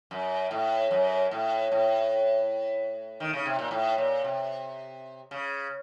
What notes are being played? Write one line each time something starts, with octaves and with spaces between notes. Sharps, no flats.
F#2
A2
F#2
A2
A2
D#3
C#3
C3
A#2
A2
A#2
C3
C#3